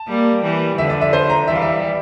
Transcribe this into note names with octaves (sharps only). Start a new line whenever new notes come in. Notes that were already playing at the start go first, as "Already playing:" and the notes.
Already playing: A5
G3 A#3
E3 G3
D3 F3 E5
D5
E5
C5
A#5
E3 G3 E5
F5
E5